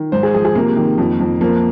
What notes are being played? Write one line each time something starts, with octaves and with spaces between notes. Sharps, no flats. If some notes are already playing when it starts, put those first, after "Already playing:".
Already playing: D#3
G#2 C5
G#4
F3 G#4
G#4
C3 A#3
D#3
F2
F2
F3 A#3